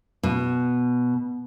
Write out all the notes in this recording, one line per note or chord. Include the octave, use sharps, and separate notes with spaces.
B2